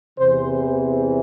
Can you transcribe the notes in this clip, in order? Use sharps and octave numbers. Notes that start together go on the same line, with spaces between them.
E2 C3 E3 C5